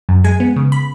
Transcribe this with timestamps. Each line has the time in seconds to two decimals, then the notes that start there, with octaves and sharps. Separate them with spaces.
0.09 F#2
0.24 G#3 G#5
0.40 B3
0.56 C#3
0.72 B5